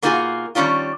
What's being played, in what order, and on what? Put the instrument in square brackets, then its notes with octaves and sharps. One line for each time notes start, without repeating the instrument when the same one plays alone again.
[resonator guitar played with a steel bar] B2 A#3 D#4 F4 F#4 G#4
D#3 G3 C#4 D4 F4